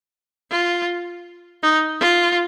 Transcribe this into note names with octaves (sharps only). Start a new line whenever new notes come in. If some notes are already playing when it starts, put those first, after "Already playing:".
F4
D#4
F4